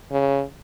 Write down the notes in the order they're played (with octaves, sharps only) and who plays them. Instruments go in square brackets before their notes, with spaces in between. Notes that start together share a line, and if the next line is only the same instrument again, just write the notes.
[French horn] C#3